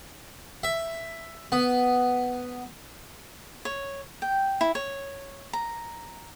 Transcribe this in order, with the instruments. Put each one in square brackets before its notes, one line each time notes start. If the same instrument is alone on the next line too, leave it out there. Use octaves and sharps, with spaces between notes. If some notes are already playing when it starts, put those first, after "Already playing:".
[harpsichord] E5
B3
[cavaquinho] C#5
G5
E4
C#5
A#5